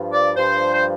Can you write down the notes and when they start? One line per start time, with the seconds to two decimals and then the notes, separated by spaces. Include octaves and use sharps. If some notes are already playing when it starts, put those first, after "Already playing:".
Already playing: G2 F3
0.12 D5
0.37 G2 F3 C5
0.73 C5